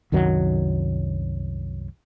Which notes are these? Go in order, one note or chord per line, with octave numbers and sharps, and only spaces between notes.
C2 F#2 D#3 F#3